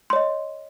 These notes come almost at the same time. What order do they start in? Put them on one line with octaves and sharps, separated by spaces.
C6 C#5 D#5